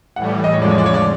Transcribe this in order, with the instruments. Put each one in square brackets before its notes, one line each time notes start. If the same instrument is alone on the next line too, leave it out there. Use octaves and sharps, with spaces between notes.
[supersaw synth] A2 E3 G3 [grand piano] F#5
[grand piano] D#5
[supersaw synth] F2 D3 F3 G#3 [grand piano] C#5
[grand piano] D5
C#5
D5
C#5
D5